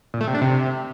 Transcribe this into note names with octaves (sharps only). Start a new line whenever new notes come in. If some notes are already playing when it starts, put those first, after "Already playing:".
A#2
A3
C3
D4
C3